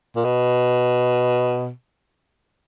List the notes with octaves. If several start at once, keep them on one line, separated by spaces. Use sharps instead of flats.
A#2
B2